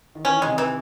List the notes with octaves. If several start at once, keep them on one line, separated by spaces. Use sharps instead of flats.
D#3
E3 C#4
D#3
C3 G#3
E3